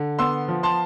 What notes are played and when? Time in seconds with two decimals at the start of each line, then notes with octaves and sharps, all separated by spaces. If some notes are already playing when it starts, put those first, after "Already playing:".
Already playing: D3
0.19 B3 C6 E6
0.48 F3
0.63 A5 C6